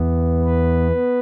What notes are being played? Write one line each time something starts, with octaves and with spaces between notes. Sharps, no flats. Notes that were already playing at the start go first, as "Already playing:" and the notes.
Already playing: E2 E3 B3
B4
B3